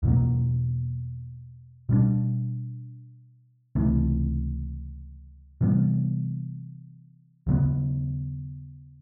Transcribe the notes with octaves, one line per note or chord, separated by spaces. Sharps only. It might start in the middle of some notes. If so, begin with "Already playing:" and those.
E2 B2 F#3 A#3
B2 G3 B3 D4
C#2 C3 E3 A3
C3 E3 G3 B3
D#2 C#3 F#3 B3